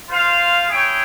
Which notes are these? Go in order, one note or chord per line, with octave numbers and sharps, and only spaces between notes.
F4 C5 F5
E4 G#4 C#5 G5